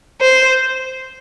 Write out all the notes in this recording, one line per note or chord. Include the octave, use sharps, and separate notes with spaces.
C5